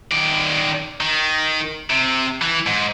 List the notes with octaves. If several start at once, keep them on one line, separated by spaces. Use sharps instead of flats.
D#3 D5
D#3
C3
E3
G#2